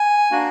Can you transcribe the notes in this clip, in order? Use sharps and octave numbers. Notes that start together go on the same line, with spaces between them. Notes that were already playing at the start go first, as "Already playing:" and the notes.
Already playing: G#5
A#3 D4 F#4